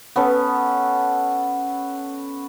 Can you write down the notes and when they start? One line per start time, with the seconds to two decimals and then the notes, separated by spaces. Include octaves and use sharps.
0.16 B3 C#4 A4